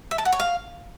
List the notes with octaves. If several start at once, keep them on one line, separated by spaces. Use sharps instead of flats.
E5
A5
F#5
C#5
F5